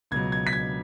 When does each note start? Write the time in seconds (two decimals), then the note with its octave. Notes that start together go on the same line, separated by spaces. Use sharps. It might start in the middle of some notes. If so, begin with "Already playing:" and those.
0.11 C#2 B2 F#3 G#6
0.32 G#6
0.47 B6
0.53 G#6